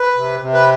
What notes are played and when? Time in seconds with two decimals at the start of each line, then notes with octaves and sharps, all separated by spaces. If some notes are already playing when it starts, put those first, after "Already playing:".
Already playing: B4
0.16 C3
0.41 C3
0.54 B4